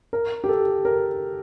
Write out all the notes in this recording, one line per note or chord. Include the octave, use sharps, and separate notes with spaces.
A#4
G4
A4
A#4